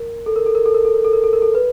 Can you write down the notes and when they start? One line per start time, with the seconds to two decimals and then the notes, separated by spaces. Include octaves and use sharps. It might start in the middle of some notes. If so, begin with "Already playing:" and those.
Already playing: A#4
0.26 A4
0.36 A#4
0.46 A4
0.55 A#4
0.66 A4
0.74 A#4
0.85 A4
0.94 A#4
1.04 A4
1.13 A#4
1.24 A4
1.33 A#4
1.42 A4
1.55 B4